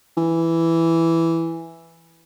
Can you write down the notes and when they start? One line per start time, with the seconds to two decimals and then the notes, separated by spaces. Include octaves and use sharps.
0.17 E3